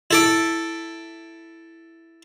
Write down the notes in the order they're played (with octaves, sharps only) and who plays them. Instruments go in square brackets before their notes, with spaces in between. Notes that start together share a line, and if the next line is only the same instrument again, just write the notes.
[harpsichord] E4 A4 D6